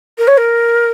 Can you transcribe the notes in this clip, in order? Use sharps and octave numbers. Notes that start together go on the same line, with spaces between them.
A#4
C#5
A#4